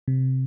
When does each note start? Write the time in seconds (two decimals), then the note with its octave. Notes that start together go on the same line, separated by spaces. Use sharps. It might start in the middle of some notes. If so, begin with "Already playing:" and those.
0.08 C3